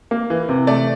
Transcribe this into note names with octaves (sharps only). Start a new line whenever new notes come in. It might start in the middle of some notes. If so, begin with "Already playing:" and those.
A#3
E3
C3
A3 D5